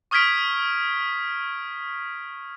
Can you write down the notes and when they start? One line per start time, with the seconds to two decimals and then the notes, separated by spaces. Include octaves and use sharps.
0.11 C#6 D#6 F6 G#6 B6 D7